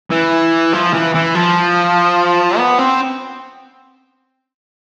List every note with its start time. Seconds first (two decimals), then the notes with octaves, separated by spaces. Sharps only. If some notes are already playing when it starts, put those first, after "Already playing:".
0.11 E3
0.73 F3
0.94 E3
1.14 E3
1.35 F3
2.58 B3
2.79 C4